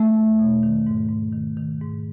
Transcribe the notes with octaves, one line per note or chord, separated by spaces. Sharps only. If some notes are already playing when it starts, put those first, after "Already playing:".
Already playing: A3
E2
B2
D#3
G#2
G#2
D#3
D#3
G#2